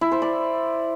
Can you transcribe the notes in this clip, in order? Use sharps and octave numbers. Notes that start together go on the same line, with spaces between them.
E4
C5
D5